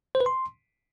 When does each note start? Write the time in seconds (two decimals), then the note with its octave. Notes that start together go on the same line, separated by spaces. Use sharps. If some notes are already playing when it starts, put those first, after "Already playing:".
0.15 C5
0.20 B4
0.26 C6